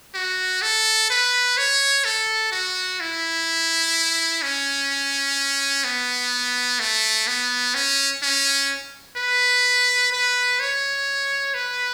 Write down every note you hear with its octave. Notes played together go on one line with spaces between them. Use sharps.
F#4
A4
B4
C#5
A4
F#4
E4
C#4
B3
A3
B3
C#4
C#4
B4
B4
C#5
B4